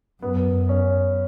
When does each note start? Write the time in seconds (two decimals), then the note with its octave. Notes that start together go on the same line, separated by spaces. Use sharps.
0.22 F#2 B3
0.69 C#4